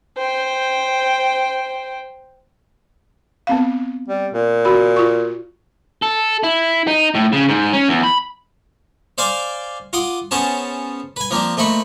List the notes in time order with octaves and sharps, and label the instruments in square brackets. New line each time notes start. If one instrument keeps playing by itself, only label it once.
[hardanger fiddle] C5 G5
[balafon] B3 C4 F5
[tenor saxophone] G3
A#2
[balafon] F#4 B5
F4 C#6
[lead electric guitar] A4
E4
D#4
A2
C#3
G#2
C#4
E2
B5
[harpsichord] C5 D5 F5 G#5 C6 D6
F4 F#5 C6 D6 D#6
B3 C#4 G#4 C5 A5
B4 G#5
F3 A#3 C4 D4
A#2 A3 C4 D#5 B5 C#6